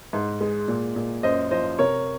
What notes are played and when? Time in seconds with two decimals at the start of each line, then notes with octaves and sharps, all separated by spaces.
0.13 G#2
0.41 G#3
0.68 A#2
0.96 A#2
1.23 F#2 C5 D#5
1.51 F3 C5 D#5
1.79 C3 A#4 C#5